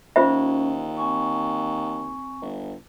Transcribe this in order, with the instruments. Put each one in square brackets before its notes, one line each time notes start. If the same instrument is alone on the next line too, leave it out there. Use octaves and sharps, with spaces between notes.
[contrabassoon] D#2 [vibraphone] C#4 [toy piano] F4 C5 E5
[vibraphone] C4 G#5 C#6
[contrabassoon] G1